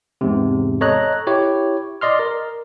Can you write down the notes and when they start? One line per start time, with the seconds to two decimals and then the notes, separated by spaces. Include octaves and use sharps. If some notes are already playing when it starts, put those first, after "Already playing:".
0.21 E2 G#2 C3
0.81 A4 C#5 D#5 A#5 F#6
1.27 E4 G4 C#5
2.01 D5 D#5 C6 F6
2.19 A#4